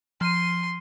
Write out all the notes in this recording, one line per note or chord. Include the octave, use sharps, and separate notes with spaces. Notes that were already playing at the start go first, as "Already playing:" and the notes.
F3 C6 D#7